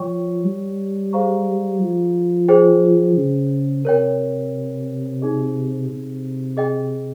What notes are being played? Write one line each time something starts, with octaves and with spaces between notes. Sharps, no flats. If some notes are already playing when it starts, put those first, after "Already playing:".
Already playing: F3 C#5 G5 C#6
G3
G#4 C5 F5 A#5 C#6
F3
G#4 C5 G5
C#3
C3 A#4 C#5 G5
D#4 G#4 D#5
C3
G#4 D#5 G5